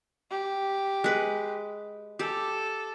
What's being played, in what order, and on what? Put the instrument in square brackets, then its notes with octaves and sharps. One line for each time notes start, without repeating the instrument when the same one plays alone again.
[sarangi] G4
[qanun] G#3 B4
[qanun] G4 [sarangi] A4